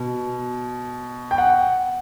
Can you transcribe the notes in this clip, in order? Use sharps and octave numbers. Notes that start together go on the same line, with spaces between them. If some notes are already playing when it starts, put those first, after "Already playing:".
Already playing: B2
G5
F#5